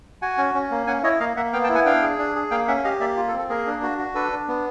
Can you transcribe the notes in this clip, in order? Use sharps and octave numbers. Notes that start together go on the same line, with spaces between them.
F#4 F#5 G#5
C#4
C#4
A#3
C#4 F#5 G#5
E4 C#5 D#5
A#3 D#5 F5
A#3 E5 F#5
B3 F5 G5
G5 A5
E4
F#5 G#5
D4 F5 G5
G#4
D4
G#4
A#3 F5 G5
C#4 E5 F#5
G4 D#5 F5
A#3 D5 E5
F4
A4
C4
A4
A#3 G#4 A#4
D4
F#4
F#4
D4 A4 B4
D4
B3